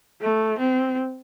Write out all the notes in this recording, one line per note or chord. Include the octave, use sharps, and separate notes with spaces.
A3
C4